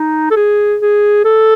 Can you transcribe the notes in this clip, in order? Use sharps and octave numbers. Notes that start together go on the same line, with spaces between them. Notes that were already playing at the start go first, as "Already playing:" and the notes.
Already playing: D#4
A4
G#4
G#4
A4